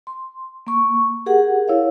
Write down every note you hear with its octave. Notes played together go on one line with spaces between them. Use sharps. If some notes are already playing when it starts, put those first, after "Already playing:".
C6
A#3 C#6
G4 G#4 A#4 F#5
E4 C#5 F5